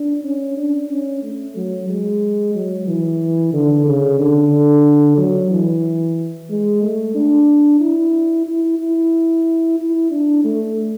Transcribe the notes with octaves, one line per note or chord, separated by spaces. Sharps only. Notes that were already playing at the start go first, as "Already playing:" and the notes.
Already playing: D4
C#4
D4
C#4
A3
F#3
G#3
F#3
E3
D3
C#3
D3
F#3
E3
G#3
A3
D4
E4
E4
E4
E4
D4
A3